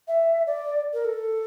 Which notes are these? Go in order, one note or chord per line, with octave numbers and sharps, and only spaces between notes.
E5
D5
A#4
A4